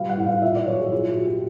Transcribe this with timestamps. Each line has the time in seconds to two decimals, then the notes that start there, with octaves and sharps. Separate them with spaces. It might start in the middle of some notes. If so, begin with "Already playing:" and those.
Already playing: A#2 G3 F5
0.09 F#5
0.17 A2
0.26 F5
0.42 A#2 E5
0.55 D5
0.67 F#3 C#5
0.79 G#4
0.92 A#2 F4
1.09 F#4
1.17 A#2
1.25 G4